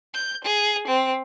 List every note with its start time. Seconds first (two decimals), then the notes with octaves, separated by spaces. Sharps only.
0.15 G6
0.45 G#4
0.87 C4